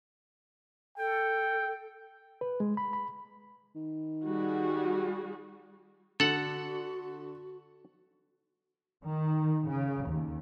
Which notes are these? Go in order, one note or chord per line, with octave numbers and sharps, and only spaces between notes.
A4 G5
B4
G#3
B5
B5
D#3
G3 F#4 G#4
D3 F#4 A4 F#5
D#3
C#3
D#2